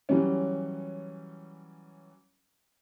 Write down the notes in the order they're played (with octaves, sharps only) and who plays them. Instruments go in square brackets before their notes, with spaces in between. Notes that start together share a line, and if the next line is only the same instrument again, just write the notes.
[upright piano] E3 F#3 G3 C#4